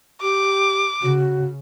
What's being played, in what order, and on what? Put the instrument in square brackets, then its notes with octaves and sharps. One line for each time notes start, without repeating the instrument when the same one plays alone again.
[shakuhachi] G4 [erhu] D6
[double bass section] C#3 [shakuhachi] F#4